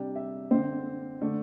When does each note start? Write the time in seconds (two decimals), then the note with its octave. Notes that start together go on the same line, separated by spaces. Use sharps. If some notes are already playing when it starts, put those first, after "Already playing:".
Already playing: C3 G3 D4 G5
0.16 E5
0.51 D3 C4 C5
1.21 D3 A3 D4